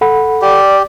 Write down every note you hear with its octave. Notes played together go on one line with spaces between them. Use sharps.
A4 F#5 B5
G4 D5